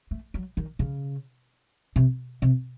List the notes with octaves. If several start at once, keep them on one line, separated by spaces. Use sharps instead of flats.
A3
F#3
D#3
C#3
C3
C3